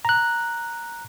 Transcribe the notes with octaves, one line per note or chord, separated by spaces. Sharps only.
A#5 F#6